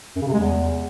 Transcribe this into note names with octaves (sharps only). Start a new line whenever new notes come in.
F#2
C#3
C3
G#3
E2